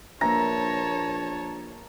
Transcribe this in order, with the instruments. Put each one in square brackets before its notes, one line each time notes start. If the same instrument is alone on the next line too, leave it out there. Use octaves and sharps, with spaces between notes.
[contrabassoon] A#1 [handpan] A#3 B4 E5 [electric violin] C#5 A5 [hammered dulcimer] A#5